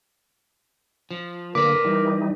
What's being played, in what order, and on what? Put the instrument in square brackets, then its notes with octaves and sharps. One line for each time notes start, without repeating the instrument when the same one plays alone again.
[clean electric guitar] F3
[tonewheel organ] D3 A#3 [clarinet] A#4 [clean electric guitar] B4 D5 [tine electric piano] D6
[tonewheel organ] E3 G3 D#4